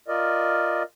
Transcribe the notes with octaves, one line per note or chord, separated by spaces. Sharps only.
F4 A#4 D5 D#5